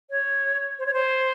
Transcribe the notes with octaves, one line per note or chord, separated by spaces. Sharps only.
C#5
C5
C#5
C5